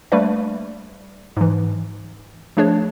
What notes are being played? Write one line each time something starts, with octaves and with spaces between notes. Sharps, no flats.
G3 A3 A#3 D4 B4 D5
G#2 E3
F3 A3 D4 G#4 C#5